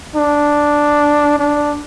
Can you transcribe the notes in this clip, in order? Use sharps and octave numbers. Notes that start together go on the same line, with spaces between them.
D4
D4